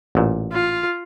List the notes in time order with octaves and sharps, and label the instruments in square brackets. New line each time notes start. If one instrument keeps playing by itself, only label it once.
[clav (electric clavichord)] A1 A#2
[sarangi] F4